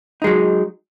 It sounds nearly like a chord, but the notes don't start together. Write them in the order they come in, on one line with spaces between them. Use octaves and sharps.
D#4 G#3 F#3